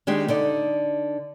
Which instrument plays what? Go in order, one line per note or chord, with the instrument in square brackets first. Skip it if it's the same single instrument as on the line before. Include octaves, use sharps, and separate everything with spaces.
[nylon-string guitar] D#3 G#3 D4 G4
D3 D#4 D5